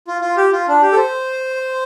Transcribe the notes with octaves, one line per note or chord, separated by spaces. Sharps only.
F4
F4
G4
F4
D4
G4
A4
C5